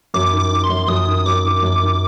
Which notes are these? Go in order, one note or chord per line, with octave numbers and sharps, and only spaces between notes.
F#2 D6
D#3
D6
D#3
C6
F#2
F#2 D#6
D#3
F#2 D6
D#3
F#2
D#3